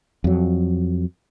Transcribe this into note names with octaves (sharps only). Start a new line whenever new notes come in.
F2 F#3